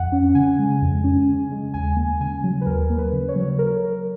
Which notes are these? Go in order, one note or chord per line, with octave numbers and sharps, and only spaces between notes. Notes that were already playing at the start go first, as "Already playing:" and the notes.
Already playing: F2 F#5
C#4
C#3 G#5
G#3
F2
C#4
C#3
G#3
D#2 G#5
A#3
C#3 G#5
F#3
B4
D#2 A#4
A#3
B4
C#3
C#5
F#3
A#4